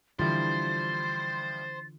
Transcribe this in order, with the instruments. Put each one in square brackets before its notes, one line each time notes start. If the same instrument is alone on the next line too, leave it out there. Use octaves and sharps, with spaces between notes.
[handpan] D3 E3 F4 [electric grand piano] F3 G3 E4 [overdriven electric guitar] C5 [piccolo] A6